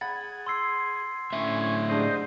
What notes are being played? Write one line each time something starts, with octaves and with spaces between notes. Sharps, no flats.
G#4 F#5 B5 A6
C6 E6 C7
A2 D3 C#4 E5 G#5
G#2 G#3 D4 G4 C5 D#5